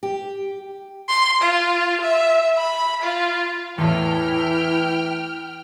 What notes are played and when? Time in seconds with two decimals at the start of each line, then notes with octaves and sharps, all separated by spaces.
0.03 G4
1.08 C6
1.42 F4
2.01 E5
2.57 B5
3.02 F4
3.78 E2 A2 E3 E4 G5 F6